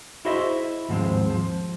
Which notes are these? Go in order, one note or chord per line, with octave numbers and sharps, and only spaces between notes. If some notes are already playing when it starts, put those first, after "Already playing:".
E4 F#4 G#4 C5 D#5 E5
D#2 G#2 F3 G#3 C4
F3